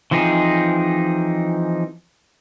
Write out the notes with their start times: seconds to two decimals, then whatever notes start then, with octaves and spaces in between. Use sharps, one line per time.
0.11 E3 F3 C4 D#4 G#4